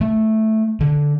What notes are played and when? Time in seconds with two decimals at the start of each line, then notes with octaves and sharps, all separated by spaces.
0.01 A3
0.80 D3